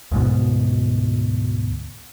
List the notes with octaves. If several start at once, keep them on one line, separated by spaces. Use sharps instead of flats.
D2 G#2 B2